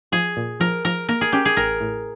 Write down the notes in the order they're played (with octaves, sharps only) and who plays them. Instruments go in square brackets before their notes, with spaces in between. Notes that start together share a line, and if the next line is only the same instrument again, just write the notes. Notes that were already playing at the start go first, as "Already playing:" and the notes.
[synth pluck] F3 [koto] G#4
[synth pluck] A#2
[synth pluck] F3 [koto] A#4
[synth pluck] F3 [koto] A#4
[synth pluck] A#3 [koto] A#4
[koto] G#4
[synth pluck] C#4 [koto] G4
[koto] G#4
[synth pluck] A1 [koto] A#4
[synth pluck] A2